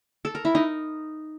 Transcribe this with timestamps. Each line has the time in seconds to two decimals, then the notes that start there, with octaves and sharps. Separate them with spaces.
0.25 A4
0.35 A#4
0.45 E4
0.55 D#4